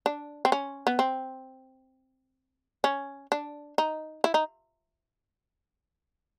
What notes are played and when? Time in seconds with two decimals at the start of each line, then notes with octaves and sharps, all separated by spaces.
0.06 D4
0.45 C4
0.52 C#4
0.87 B3
0.99 C4
2.84 C#4
3.32 D4
3.78 D#4
4.24 E4
4.34 D#4